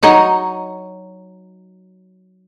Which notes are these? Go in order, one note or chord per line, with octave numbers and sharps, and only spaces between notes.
F#3 D#4 C#5 D#5